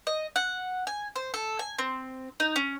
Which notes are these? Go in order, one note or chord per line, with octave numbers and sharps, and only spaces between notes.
D#5
F#5
G#5
C5
A4
G#5
C4
D#4
C#4